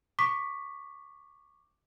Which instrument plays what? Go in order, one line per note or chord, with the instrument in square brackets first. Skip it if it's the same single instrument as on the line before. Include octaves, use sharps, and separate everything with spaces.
[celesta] C#6 D6 B6